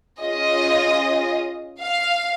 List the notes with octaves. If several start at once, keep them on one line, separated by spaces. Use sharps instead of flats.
C#4 F4 G#4 D#5
F5